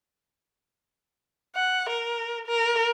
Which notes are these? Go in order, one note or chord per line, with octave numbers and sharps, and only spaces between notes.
F#5
A#4
A#4